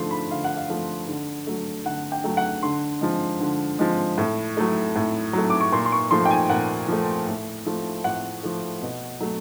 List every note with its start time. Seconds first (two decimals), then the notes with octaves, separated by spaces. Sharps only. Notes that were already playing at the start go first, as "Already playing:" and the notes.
Already playing: D3 F3 A3 C6
0.11 B5
0.31 D3 F5
0.44 F#5
0.57 F5
0.70 F3 A3
1.08 D3
1.47 F#3 A3
1.85 D3 F#5
2.12 G5
2.24 F#3 A3
2.37 F#5
2.63 D3 C6
3.01 F3 G#3
3.40 D3
3.79 F3 G#3
4.18 A2
4.57 F#3 A3
4.96 A2
5.33 F#3 A3
5.50 D6
5.61 C#6
5.72 A#2 C6
5.86 C6
5.92 C#6
6.11 F3 A3 C6
6.26 G5
6.31 G#5
6.49 A#2 F#5
6.88 F3 A3
7.27 A2
7.66 F3 A3
8.04 A2 F#5
8.43 F3 A3
8.82 B2
9.20 F#3 A3